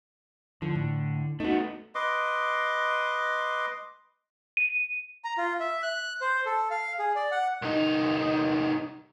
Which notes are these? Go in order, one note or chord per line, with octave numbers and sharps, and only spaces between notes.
D3 F3
A2
A3 B3 D#4 F#4
B4 D#5 C6 D6
D#7
A#5
F4
E5
F#6
C5
A4
F5
G#4
D5
F#5
C2 D#4